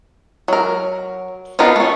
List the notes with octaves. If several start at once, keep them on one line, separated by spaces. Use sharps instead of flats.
F#3 A#4
B3 D4 D#4 F4 A#4
A3 C#4